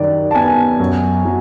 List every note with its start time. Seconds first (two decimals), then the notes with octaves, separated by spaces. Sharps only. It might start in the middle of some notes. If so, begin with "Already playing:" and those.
Already playing: F#2 D#3 G3 D5
0.31 A5
0.35 B3 G#5
0.80 F#2
1.25 F#3